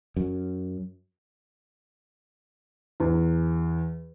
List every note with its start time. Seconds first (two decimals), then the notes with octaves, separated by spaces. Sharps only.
0.16 F#2
3.00 E2